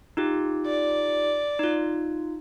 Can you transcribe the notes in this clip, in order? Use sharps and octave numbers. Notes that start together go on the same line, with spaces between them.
D#4 F4 G4
D5
D#4 F4